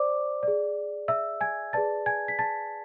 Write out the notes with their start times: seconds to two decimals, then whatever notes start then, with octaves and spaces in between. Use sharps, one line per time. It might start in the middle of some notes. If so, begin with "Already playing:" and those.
Already playing: C5 D5 D6
0.43 G#4 D5
1.08 E5 E6
1.41 G#5 G#6
1.73 G#4 B4 D5 A5 A6
2.06 G#5 G#6
2.28 B6
2.39 A5 A6